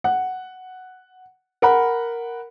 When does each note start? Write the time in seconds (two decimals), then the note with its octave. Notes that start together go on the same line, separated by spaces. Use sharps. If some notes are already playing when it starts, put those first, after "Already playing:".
0.04 F#5
1.62 A#4 F#5 B5